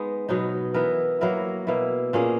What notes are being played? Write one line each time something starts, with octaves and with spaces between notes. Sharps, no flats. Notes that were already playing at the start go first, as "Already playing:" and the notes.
Already playing: G#3 B3 D#4
B2 F#3 B3 D#4
E3 B3 E4 A#4
F#3 A#3 E4 A#4
B2 A#3 E4
A#2 A#3 C#4 G#4